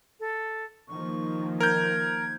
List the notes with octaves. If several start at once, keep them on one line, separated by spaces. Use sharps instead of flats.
A4
D#3 F3 A#3 C#6
A#4 G6 G#6